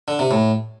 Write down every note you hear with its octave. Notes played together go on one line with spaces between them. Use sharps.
D3
C3
A2